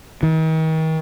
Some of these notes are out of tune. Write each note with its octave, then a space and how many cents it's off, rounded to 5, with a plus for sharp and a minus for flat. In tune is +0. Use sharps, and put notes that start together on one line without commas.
D#3 +40